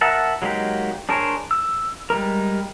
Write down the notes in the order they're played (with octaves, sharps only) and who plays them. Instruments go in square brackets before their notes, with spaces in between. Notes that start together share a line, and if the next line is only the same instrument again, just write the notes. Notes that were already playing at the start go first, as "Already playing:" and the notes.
[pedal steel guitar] A#4 E5 F#5 A5
F#3 G#3 A#3 D#4 G4
D4 G#4 A#4 C5 C#5
E6
G3 G#3 A#4